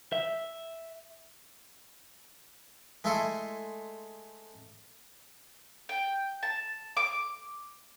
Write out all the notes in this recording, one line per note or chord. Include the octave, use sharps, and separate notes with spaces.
E5
G#3 A3 E4 A4 C6 D#6
G5
A5
D6